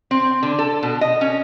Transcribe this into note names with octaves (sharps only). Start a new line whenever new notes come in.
C4
D3
A4
B2
D#5
C#4